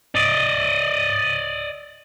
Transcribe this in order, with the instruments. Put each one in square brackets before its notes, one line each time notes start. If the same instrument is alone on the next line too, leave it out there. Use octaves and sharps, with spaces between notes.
[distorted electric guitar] D5 D#5